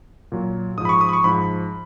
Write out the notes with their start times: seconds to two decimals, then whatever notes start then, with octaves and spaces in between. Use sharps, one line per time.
0.32 A#2 F#3
0.78 G#2 F3 D#6
0.85 B5
0.89 C#6
1.01 D#6
1.09 B5
1.13 C#6
1.24 G#2 F3 B5